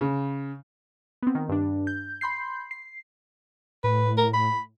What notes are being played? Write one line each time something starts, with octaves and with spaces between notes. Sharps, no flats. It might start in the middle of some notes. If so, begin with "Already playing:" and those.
C#3
B3 C4
D#3
G2 D4
G6
B5 C6 G6 C7
C7
A2 B4
A#4
B5